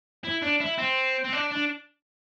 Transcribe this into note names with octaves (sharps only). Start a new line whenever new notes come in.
E4
D4
E4
C4
C4
D4
D4